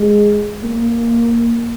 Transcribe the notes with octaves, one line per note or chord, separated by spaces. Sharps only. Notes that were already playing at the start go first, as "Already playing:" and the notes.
Already playing: G#3
A#3